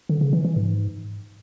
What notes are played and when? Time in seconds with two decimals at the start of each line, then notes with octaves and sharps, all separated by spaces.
0.09 D3
0.21 C#3
0.33 E3
0.45 E3
0.56 G#2